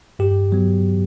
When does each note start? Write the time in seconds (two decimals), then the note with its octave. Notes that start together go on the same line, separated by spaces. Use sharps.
0.19 G2 G4
0.52 F#3 B3